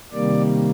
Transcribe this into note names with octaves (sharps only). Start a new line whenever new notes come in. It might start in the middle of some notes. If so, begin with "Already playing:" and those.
C3 D#3 G3 A#3 D5